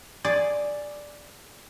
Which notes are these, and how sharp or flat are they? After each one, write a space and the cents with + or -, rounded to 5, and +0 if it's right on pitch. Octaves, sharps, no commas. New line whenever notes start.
G#4 +0 D5 +0